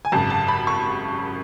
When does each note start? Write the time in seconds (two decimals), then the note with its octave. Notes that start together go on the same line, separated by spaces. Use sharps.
0.05 G#5
0.12 G#1 F#2 C#3 A5
0.30 A5
0.48 B5
0.67 C#6